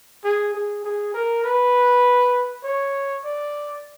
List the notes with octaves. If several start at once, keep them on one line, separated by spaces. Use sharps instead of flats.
G#4
G#4
G#4
A#4
B4
C#5
D5